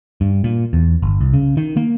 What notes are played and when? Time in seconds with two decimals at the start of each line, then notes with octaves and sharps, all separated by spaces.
0.21 G2
0.44 A#2
0.73 E2
1.02 G1
1.21 C2
1.34 C#3
1.57 D#3
1.77 A#3